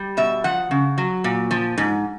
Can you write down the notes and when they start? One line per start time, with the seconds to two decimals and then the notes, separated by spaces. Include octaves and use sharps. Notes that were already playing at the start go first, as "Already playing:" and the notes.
Already playing: G3
0.17 B2 E5
0.44 F3 F#5
0.71 C#3
0.98 F#3
1.24 A#2
1.51 F3
1.78 G#2